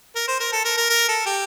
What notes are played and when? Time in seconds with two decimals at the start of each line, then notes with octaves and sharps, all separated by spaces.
0.16 A#4
0.28 C5
0.40 A#4
0.52 A4
0.65 A#4
0.77 A#4
0.90 A#4
1.08 A4
1.26 G4